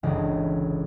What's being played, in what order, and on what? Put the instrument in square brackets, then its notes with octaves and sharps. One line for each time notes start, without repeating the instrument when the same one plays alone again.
[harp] G1 C#2 E3 D#5